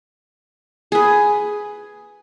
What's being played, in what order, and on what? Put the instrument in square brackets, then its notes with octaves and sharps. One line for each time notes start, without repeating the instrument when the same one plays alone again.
[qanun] G#4 B4